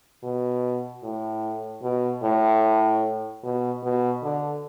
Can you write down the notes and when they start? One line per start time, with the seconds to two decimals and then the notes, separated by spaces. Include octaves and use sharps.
0.24 B2
1.03 A2
1.83 B2
2.23 A2
3.43 B2
3.83 B2
4.23 D3